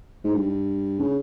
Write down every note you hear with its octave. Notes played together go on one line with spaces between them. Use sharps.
G#2
G2
C#3